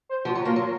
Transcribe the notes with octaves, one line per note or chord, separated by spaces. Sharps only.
C5
F3 F#4
F#3 F#4
A#3 F4
F#3 F4